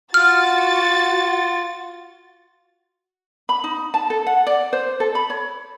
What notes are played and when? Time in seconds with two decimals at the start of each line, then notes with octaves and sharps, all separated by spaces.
0.14 F4 F#4 F6 A6
3.49 B5
3.64 D#4
3.94 A5
4.10 A4
4.27 F#5
4.47 D5
4.73 C5
5.00 A4
5.15 B5
5.30 C#5